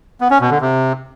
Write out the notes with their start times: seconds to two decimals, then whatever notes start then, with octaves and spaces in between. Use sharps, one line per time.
0.21 B3
0.31 C#4
0.41 B2
0.51 D3
0.61 C3